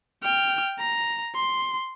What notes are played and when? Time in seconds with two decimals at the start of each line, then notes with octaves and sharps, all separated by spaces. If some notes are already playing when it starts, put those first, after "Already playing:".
0.23 G5 F6
0.79 A#5
1.36 C6